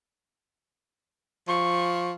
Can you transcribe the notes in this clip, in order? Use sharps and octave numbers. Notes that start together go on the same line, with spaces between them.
F3 C#6